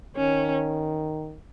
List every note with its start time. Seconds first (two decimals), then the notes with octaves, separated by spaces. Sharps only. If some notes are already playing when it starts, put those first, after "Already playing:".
0.16 D#3 C#4